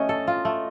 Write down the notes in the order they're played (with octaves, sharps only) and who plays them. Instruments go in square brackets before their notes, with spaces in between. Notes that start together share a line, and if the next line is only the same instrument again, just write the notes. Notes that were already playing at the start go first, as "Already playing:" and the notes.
Already playing: [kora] A3 C#4 [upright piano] D#5
[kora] A4
F4
A3